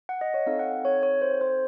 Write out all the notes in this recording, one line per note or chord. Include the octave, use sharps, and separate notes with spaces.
F#5
D#5
C#5
C4 D#4 A4 F5
F#5
C#5
C#5
C5
C5